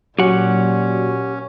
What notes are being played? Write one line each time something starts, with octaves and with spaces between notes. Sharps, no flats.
A#2 F#3 C#4 F#4 G4 F#5